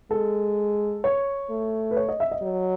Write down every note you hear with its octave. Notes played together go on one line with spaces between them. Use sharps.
G#3 A4
C#5
A3
B4
C#5
D#5
E5
D#5
F#3